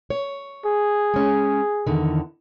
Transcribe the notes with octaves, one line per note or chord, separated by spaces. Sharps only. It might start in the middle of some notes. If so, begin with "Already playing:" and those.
C#5
G#4
G#3 C#4
E2 D3 D#3